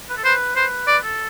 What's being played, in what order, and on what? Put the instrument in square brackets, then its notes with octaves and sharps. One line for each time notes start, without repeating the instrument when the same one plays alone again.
[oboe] B4
A4
[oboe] B4 [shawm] C5
[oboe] B4 [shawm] C5
[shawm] D5
[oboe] A4